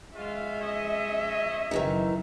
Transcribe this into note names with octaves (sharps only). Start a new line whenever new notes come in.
G#3 F4 F#4 E5 F5
C#5 D#5
F#1 D#3 E3 F#3 D#4